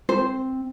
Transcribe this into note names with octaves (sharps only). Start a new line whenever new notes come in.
C4 C5